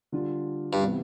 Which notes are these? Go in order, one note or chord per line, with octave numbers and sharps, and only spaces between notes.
D3 G3 D4 F4
G2
C3 E3 B3